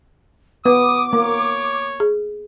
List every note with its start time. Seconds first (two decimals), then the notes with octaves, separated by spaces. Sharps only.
0.66 B3 B4 D6 D#6
1.13 A#3 C#5
2.00 G#4